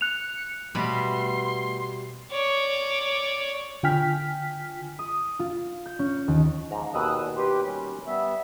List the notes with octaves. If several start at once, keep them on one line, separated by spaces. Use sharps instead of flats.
F#6 C#7 F7
B2 G3 A3 B5 C6
C#5 D5
D3 F4 G5 G#5 F6 B6
D#6
F4
G6
C#4
D#2
G#2 F3 A#5
D#2 B2 D#6 E6 F#6
A#2
G4 B4 C6
G3 C#4
G3 B3 E5